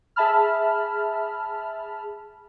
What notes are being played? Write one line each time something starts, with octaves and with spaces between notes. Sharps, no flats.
G#4 E5 A5 B5 F6